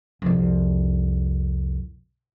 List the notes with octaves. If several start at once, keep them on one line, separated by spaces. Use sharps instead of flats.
C2 F2